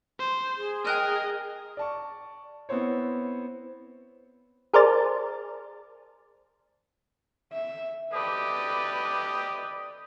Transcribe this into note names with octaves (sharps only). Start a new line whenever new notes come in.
C5
G#4
A#4 D#5 G5 F#6 D#7
D5 A5 C#6
B3 C4 E4 C5 C#5
G#4 A#4 C5 D5 A5
E5
G4 A4 B4 D5 D#5